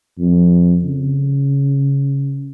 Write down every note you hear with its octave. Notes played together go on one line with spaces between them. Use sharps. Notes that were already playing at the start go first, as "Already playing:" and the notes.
F2
C#3